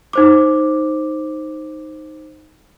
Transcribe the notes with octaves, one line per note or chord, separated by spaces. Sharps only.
D#4 C5 D6